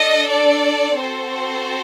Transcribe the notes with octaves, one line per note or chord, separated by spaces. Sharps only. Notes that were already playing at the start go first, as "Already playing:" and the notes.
Already playing: D4 A4 D#5
D5
C4 F#4 A4 C5